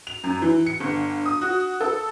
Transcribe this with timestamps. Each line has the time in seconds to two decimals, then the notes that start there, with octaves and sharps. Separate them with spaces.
0.07 F7
0.24 F#2
0.42 E3
0.66 C#7
0.80 G1
1.26 D#6
1.41 F#4
1.80 A4